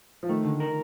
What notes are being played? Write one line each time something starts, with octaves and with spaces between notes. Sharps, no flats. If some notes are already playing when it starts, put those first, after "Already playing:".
F3
D#3 A3
D3
A#4